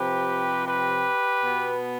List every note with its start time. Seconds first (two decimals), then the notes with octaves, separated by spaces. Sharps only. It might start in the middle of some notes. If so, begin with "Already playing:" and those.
Already playing: C3 F3 C4 G4 B4
0.66 G4 B4
1.40 B2 B3